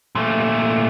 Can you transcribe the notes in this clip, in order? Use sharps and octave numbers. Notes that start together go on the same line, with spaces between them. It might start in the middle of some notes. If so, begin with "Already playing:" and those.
A#2 A3